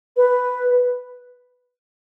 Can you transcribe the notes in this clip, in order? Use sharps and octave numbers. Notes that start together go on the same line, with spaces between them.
B4